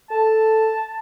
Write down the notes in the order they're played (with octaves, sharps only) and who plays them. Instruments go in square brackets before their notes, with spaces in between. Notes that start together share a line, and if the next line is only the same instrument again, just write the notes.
[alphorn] A4 [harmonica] A5